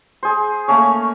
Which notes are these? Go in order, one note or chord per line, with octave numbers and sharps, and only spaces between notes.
G#4 C5
A3 A#3 C#4 C#5